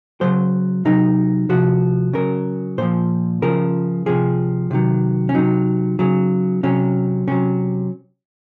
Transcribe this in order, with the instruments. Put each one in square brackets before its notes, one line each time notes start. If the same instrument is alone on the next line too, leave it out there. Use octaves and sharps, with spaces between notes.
[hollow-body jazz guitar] C#3 F#3 C5
C3 F#3 D#4
C3 F3 F#4
C#3 F#3 A#4
A#2 F3 C5
C#3 F3 A#4
C3 F3 G#4
C3 D#3 F#3
C#4
C3 F#3 D#4
C#3 F#3
C3 F#3 C#4
C3 F#3 C#4